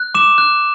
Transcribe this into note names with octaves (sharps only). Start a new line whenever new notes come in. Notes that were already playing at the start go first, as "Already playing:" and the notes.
Already playing: F#6
D6 E7
F#6